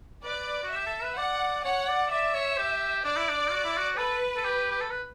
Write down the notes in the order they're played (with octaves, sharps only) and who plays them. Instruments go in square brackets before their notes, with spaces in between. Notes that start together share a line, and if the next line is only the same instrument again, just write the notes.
[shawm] B4 [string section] D5
[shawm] F#4
[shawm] G4 [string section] E5
[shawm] A4
B4
[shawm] D5 [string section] F#5
[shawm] C#5 [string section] F#5
[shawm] D5
[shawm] D5 [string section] E5
[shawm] C#5
G4
[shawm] D4 [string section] D5
[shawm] E4
D4
F#4
E4
F#4
[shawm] A4 [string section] B4
[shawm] A4
G4
G4
A4
B4